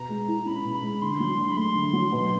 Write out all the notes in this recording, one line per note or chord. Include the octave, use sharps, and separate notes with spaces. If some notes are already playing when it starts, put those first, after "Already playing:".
Already playing: B2 A#5
G#3
E4
C#4 B5
B2
B5
G#3
D3 C6
F#3
D4
B5
A3 C6
D3
F#3
B2